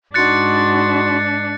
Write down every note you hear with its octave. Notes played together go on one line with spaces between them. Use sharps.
G#2 D4 D#4 F#4 C6 F#6 A6 C#7